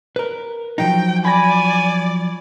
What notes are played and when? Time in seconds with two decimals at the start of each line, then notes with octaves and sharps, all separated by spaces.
0.16 A#4 B4
0.78 F3 F#3 D#4 G5
1.25 D5 G#5 B5 A#6